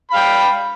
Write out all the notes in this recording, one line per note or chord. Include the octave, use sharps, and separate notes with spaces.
F5 G5 B5